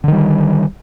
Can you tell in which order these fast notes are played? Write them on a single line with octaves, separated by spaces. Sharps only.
D3 D#3 G3